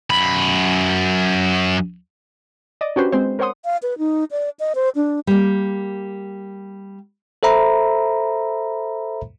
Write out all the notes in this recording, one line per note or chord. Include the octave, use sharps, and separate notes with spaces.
F#2 B5
D5 D#5
C#4 D4 F#4 G4 B4 C5
G#3 C4 C5
A#4 C5 C#5 F#5 C6 D#6
F5
B4
D#4
D5
D#5
C5
D4
G3 A#3
A4 C5 E5 A#5 B5